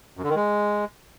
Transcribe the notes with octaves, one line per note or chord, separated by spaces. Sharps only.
F#2
D3
D#3
G#3